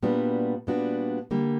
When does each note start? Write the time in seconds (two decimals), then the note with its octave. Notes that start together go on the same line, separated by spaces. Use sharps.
0.03 A#2 G3 B3 D4 F#4
0.67 A#2 G3 B3 D4 F#4
1.31 D3 G3 A#3